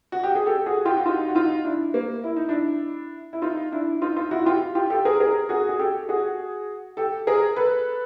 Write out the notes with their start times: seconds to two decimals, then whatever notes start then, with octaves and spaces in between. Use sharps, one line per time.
0.12 F#4
0.24 G4
0.35 G#4
0.46 G4 A4
0.66 F#4 G#4
0.85 F4 G4
0.97 F#4
1.06 D#4 F4
1.28 F#4
1.35 D#4 F4
1.65 D4 E4
1.94 A#3
2.24 E4
2.37 D#4
2.48 D4 E4
3.33 E4
3.42 D#4 F4
3.72 D4 E4
4.01 D#4 F4
4.16 D#4 F4
4.31 E4 F#4
4.45 F4 G4
4.75 F4 G4
4.90 G4 A4
5.05 G#4 A#4
5.20 G#4 A#4
5.49 F#4 G#4
5.69 G#4
5.79 G4 A4
6.09 F#4 G#4
6.97 G4 A4
7.27 G#4 A#4
7.56 A4 B4